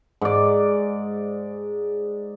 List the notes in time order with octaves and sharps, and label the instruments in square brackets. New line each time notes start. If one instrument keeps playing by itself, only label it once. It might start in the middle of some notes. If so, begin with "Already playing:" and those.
[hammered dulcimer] G#2 D5